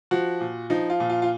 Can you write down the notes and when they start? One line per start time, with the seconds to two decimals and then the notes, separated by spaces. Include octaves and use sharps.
0.11 F3 F#4
0.41 A#2
0.70 F3 D#4
0.90 F4
1.00 A#2
1.09 F4
1.22 F4